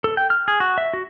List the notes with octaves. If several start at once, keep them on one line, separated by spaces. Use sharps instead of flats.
A4
G5
F6
G#4
F#4
E5
F#4